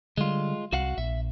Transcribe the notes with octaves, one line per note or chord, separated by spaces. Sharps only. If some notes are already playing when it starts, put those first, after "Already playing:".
D3 G3 G#3 F4
C2 F#4 F5 F#5
A#1 E5